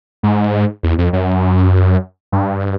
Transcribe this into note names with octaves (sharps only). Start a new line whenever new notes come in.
G#2
E2
F2
F#2
G2